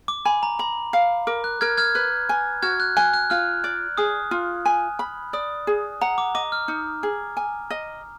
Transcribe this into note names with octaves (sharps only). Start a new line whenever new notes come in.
D6
G#5 B5
A#5
A#5 B5
F5
A#4 D6
F#6
A#4 F6 G#6
F6 G#6
B4 F#6
G#5
F#4 F6 G#6
F#6
G#5 F#6
F#6
F4 F6
D5
G#4 D#6
F4
G#5
B5
D5 D#6
G#4
F#5 A#5
D6
D#5 D6
F6
D#4
G#4
G#5
D#5